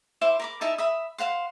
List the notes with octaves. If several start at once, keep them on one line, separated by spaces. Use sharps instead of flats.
E4 C5 E5 D6
A#4 B5 D6
D#4 E4 E5 A5
E5 B5 D#6
C5 F5 F#5 C6